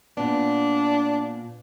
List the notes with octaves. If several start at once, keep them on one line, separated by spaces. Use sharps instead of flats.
A#2 B3 D4